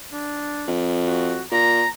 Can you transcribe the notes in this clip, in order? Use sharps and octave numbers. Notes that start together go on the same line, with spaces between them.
D4
F2
F#4
A#2 A#5